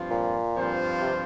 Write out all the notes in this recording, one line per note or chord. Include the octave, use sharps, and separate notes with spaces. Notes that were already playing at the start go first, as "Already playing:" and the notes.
Already playing: G2 F3 C4 F4
A#2
G2 F3 C4 F4 C5
C3